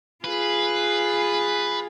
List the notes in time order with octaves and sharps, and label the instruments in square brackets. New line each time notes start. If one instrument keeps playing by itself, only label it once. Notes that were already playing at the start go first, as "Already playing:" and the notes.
[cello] F4 G#4 [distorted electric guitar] B4